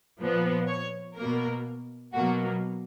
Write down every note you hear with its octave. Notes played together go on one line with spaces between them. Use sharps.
A#2 F3 B3
C#5
B2 A#3 A#4
B2 F#3 A#3 F#4